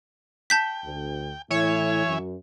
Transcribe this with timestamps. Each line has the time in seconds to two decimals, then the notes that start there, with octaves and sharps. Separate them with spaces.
0.50 G5 A5 G6 B6
0.85 D2
1.51 A2 E3 E4 C#5 E5 G#5
2.06 F#2